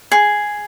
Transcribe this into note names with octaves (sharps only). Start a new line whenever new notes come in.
G#4